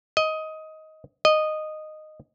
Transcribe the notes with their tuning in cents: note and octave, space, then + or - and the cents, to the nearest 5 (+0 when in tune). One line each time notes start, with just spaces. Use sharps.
D#5 +15
D#5 -10